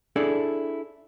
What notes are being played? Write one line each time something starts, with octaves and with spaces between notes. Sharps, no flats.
D4 E4 G#4 A4 D5